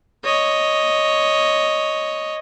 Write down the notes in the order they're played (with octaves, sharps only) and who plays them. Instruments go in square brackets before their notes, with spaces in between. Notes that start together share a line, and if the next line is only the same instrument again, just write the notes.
[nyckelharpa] C#5 D#5